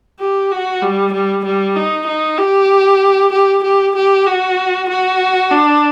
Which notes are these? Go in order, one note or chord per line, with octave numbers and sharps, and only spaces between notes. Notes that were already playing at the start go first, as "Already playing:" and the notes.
G4
F#4
G3
G3
G3
D#4
D#4
G4
G4
G4
G4
F#4
F#4
D4